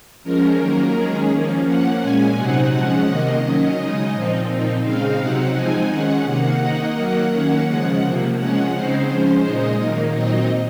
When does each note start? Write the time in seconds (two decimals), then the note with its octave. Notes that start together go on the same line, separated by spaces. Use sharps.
0.24 F3 G#3 C#4 A#4
0.59 D#3 F#3 A#3 C#4 A#4
0.94 D#3 G#3 C#4 G#4
1.30 F3 A#3 C#4
1.65 F3 A#3 C#4 F#5
2.00 A#2 G#3 C#4 G#5
2.36 C3 F#3 C4 D#4 F#5
2.72 F3 G#3 C#4
3.06 C3 D#3 A#3 D#5
3.42 D#3 F#3 C#4
3.77 C#3 G#3 D#4
4.13 A#2 F3 C4 D#4
4.48 A#2 F3 C4 D#4
4.83 C#3 G#3 C4 D#4 F5
5.19 C3 F#3 C4 D#4 F#5
5.54 F3 G#3 C4 D#4 G#5
5.89 D#3 G#3 C#4 F#5
6.25 C3 D#3 A#3 F#5
6.60 D#3 A#3 D#4
6.96 D#3 F#3 A#3
7.31 D#3 A#3 C#4 F#5
7.66 C#3 F3 G#3 F#5
8.02 C3 F3 A#3
8.37 F3 G#3 C#4 F#5
8.73 C#3 G#3 C4 D#4 C5
9.08 F3 G#3 C#4
9.43 A#2 G#3 D#4 D#5
9.79 D#3 F#3 A#3 D#4
10.14 A#2 F#3 C4 D#4 D#5